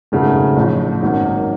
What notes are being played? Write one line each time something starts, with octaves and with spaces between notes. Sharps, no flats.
G#1 F#2 C#3 F#3 A3
A1 A2 F3
G#1 F#2 D#3 F#3 A#3